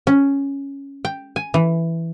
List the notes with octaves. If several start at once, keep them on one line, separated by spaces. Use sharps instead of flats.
C#4
G5
G#5
E3